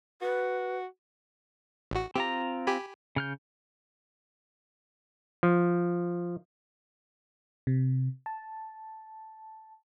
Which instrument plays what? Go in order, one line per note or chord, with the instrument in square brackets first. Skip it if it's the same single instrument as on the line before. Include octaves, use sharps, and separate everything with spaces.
[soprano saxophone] F#4 [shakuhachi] B4
[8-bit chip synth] A1 F#4
[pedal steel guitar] C4 F4 A#5 [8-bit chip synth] G4
[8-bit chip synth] G4 G#5 B5
[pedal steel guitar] C#3 F6 G6
[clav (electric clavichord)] F3
[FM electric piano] C3
A5